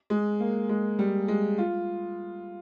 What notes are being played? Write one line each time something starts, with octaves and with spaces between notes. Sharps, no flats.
G#3
A#3
G#3
G3
G#3
F4